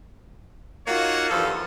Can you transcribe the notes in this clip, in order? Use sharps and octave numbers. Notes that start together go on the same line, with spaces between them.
A#3 D#4 F4 F#4 C#5 F#5
G2 E3 F3 A4